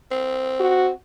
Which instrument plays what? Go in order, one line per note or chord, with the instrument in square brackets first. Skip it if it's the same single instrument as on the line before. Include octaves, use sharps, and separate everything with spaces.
[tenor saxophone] C4
[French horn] F#4